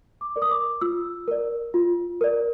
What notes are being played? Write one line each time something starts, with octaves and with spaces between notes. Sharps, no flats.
D6
A#4 D5
D#6
D6
F4 E6
A#4 D5
F4
A#4 D5